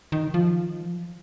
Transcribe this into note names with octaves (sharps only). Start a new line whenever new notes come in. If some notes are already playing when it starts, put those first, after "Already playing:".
D#3
F3